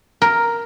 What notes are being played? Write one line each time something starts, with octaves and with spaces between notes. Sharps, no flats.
A#4